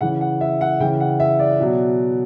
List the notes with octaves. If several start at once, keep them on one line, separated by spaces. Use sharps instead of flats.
C#3 E3 F#5
F#5
E5
F#5
C#3 E3 G5
F#5
E5
D5
B2 F#3